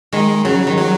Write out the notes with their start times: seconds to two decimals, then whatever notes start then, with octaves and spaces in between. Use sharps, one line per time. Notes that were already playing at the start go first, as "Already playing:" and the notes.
0.13 D#3 G#3
0.45 C#3 F#3
0.67 D#3
0.77 F#3